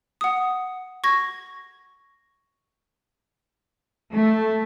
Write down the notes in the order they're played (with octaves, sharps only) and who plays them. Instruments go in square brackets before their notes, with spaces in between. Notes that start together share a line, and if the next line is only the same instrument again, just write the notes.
[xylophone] F#5 D#6
C#6 G#6 A#6
[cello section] A3